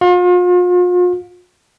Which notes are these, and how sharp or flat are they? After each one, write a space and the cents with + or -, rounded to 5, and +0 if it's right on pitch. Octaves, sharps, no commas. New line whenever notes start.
F4 +40